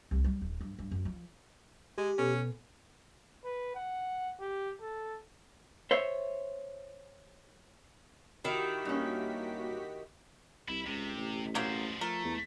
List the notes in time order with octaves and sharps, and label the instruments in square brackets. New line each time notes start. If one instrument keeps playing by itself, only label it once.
[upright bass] C2
G3
D#1
G2
G2
F#2
F3
[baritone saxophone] G#3 [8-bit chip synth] G4
[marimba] B2 B3 A4 [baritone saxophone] C#4
[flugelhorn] B4
F#5
G4
A4
[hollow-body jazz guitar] C5 C#5 E5
[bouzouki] D#3 E4 [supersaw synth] F#4 G4 B6
[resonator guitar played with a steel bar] G2 C#4 [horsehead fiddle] A#3
[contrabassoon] C2 [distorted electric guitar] E4
[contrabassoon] C#2 [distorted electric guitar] C3
[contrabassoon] A1
[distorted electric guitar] B2 C5 [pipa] F#3 A#3 C4
[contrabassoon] F3 [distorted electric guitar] A3 [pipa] A#4
[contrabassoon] E2